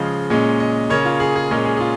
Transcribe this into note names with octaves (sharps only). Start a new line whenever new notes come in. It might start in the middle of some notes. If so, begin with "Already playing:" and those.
Already playing: C#3 F3 G#3 F5
A#2 G#3 C#4
D#5
C#3 A#3 C#4 C#5
F4
G#4
G#4
A#2 G#3 C#4 A#4
G#4
G#4
F4